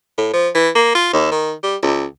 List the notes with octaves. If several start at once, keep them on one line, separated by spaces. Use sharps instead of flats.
A2
F3
E3
A#3
F4
D#2
D#3
G3
C#2